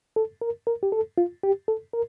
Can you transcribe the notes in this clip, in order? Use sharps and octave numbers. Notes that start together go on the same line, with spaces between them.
A4
A#4
A#4
G4
A4
F4
G4
A4
A#4